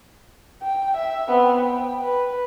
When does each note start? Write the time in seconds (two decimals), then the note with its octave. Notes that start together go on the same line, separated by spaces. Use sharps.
0.63 G5
0.96 E5
1.28 B3 C4
1.65 G5
2.04 B4